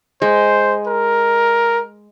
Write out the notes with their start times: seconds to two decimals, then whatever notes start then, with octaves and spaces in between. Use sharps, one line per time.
0.22 G#3 C5
0.87 A#4